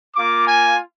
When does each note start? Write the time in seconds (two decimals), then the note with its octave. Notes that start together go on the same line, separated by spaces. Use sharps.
0.14 A#3 F4 D6
0.46 G#5